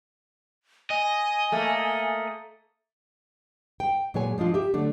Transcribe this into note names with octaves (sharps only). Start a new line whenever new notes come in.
D#5 G#5
A3 A#3
G5
A#2 F#3 G#3 C#5 G#5
F3 G#3 D4 F4
G4 E5
D3 F#3 A3 D4